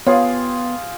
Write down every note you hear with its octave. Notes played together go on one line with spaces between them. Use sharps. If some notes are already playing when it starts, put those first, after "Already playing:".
B3 F4 G4 G#4 C#5